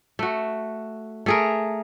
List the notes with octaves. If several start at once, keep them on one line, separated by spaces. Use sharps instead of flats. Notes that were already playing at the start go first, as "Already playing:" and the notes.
A3 F#4
A3 G#4 A#4